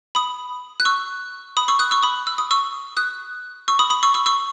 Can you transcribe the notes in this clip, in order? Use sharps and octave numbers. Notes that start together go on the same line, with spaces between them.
B5 D#6
F#6
C#6 E6
B5 D#6
C#6 E6
D#6 F#6
C#6 E6
B5 D#6
E6
D#6
C#6 E6
D#6 F#6
C#6 E6
B5 D#6
B5 D#6
C#6 E6
C#6 E6
C#6 E6